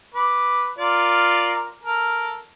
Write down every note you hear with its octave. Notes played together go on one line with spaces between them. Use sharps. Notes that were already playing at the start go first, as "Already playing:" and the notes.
B4 D6
F4 A#4 D5
A4 A#4